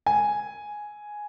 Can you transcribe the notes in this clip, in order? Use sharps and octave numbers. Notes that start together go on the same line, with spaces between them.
G#5